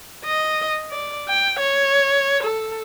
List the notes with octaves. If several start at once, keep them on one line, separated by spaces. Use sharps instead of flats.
D#5
D5
G5
C#5
A4